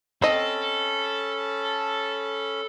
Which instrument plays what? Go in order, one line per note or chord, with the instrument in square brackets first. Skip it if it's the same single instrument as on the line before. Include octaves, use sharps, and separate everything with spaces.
[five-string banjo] C4 D#5 [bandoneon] C#4 B5 [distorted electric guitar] A4